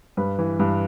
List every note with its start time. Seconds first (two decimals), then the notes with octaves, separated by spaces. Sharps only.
0.17 G2 B4
0.39 E3
0.59 G2